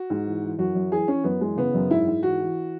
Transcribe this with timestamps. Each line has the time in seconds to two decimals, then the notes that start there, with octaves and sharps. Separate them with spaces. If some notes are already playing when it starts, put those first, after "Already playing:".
Already playing: F#4
0.10 G#2
0.25 E3
0.42 E3
0.58 F#2 F#4
0.75 F#2
0.91 E3 G#4
1.08 E3 C#4
1.24 F#2 B3
1.40 E3 G#3
1.57 C#3 B3
1.74 F#2
1.90 G#2 E4
2.07 G#2
2.22 E3 F#4
2.39 E3